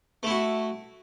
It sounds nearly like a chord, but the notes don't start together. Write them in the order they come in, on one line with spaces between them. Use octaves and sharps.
A3 E4 F#4